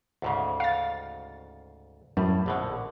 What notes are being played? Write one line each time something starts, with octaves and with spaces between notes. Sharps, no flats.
D2 G#2 C#3
F5 A6
F#2 A2 G3
A#1 B2 D3